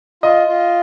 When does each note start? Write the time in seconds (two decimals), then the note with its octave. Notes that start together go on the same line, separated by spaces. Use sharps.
0.23 F4 D#5
0.47 F4